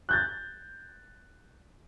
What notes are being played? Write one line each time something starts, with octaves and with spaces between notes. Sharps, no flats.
F#6 G6 A6